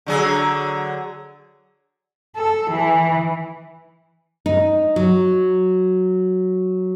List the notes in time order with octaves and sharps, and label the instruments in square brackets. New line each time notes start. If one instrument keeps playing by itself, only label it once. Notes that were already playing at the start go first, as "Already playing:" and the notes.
[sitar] D3 F#3 G#4
[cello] A4
E3
[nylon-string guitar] D#4
F#3